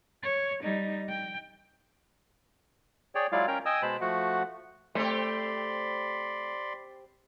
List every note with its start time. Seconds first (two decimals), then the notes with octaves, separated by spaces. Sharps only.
0.23 C#5
0.63 G3 D#4
1.10 G5
3.15 G#4 C#5 D5 G5
3.32 F#3 G#3 E4 F4 D5 F5
3.47 C#4 A#4 G5 A#5
3.66 D#5 G5 G#5 D#6 E6
3.82 B2 G#3 C5 A5 B5
4.01 F3 A3 F#4 F#5
4.95 A3 C4 G4 D5 B5 C6